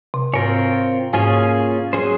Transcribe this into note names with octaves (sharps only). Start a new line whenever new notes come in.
C3
G#2 C4 F4 A#4 C#5
G#2 A#3 C#4 F4 G#4 C#5
F#3 C#4 G#4 C5